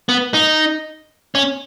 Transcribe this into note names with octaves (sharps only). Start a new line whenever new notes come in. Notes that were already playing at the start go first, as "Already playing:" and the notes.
B3
D#4
C#4